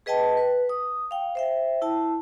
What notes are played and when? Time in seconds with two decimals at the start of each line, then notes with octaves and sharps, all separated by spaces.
0.06 G#4 B4 D#5 G5 A5
0.37 B4
0.69 D#6
1.11 F5 G5
1.35 C5 E5 G5
1.82 E4 A5